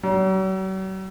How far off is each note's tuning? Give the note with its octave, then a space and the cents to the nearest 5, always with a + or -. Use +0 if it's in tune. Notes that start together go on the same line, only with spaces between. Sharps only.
F#3 +45